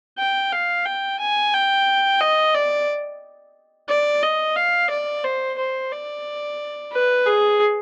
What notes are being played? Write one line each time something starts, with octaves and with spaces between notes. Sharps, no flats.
G5
F5
G5
G#5
G5
D#5
D5
D5
D#5
F5
D5
C5
C5
D5
B4
G#4